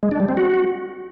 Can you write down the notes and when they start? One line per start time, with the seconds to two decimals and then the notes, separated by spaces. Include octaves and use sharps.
0.03 G#3
0.11 D4
0.20 G3
0.29 C4
0.37 F#4